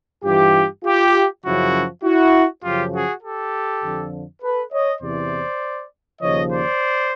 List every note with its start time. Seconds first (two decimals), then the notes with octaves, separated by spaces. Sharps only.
0.24 G2 E3 F4 G4
0.84 F4 G4
1.44 F#2 C#3 F3 E4 F#4
2.04 E4 F#4
2.63 F#2 C#3 F3 F4 G4
2.93 F#4 G#4
3.23 G4 A4
3.83 F2 D3 F3
4.42 A4 B4
4.72 C#5 D#5
5.01 E2 C3 E3 C5 D5
6.21 D#2 C#3 F3 C#5 D#5
6.50 C5 D5